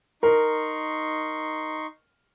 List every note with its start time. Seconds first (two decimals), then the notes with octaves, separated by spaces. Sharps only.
0.23 D#4 A#4 C6 C#6